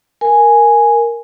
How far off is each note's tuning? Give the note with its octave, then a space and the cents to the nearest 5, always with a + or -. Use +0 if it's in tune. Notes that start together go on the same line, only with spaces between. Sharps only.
A#4 +0 G#5 +0